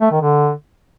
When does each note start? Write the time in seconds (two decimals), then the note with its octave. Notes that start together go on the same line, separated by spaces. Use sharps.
0.01 A3
0.11 D#3
0.22 D3